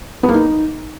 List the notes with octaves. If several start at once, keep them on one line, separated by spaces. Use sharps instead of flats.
B3
A#3
D#4